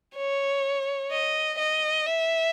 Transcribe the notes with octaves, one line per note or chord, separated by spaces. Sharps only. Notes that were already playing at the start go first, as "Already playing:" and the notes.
C#5
D#5
D#5
E5